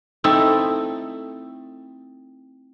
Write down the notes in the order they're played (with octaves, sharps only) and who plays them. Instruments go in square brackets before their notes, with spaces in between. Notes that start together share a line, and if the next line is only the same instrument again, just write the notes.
[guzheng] A3 C4 D#4 E4 A4